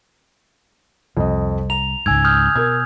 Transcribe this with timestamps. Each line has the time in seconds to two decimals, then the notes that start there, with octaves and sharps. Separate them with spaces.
1.17 C2 F2 D#5
1.70 A#5 F7
2.06 C#2 G#2 G#5 E6 G#6
2.25 D#6 F6 G6
2.55 B2 A#4 G#6